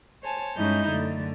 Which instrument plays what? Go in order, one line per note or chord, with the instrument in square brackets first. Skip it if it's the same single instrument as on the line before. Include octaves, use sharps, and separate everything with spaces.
[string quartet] C5 C#5 G#5 A5
G2 G#3 C#4 D#4 E4 G6
F#2 D3 A3